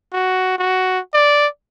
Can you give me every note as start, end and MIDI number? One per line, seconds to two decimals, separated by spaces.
0.13 0.56 66
0.58 0.99 66
1.14 1.47 74